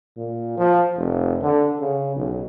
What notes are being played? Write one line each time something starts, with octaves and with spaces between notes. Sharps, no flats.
A#2
F3
F1
D3
C#3
B1